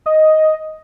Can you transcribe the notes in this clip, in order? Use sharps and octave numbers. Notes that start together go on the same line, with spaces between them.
D#5